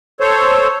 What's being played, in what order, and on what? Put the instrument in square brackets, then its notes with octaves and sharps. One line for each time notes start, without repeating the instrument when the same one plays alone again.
[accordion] A4 C5 C#5